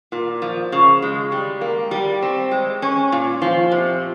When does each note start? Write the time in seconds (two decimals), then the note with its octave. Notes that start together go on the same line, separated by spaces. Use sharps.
0.12 A#2
0.42 F3
0.72 C#3
1.02 G#3
1.32 G3
1.61 A#3
1.91 G3
2.22 C4
2.51 G#3
2.82 C#4
3.12 A#2
3.42 F3
3.72 C3